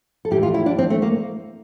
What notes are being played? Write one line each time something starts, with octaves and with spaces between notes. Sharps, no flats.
A4
A2 E3 G3 G4
F4
E4
D4
C4
A3
A#3